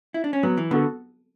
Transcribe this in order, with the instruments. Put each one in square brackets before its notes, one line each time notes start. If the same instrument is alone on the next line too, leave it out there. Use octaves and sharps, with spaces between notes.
[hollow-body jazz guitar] E4
D4
C#4
[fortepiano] F#3 [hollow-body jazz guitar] B3
[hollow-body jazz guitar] E3
[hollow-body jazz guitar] D3 [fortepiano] B3 F#4 A4